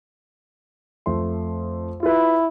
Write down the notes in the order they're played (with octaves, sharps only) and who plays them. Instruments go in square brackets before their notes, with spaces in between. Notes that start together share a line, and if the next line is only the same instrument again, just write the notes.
[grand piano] F2 A3 C6
[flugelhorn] E4 [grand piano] F4 B4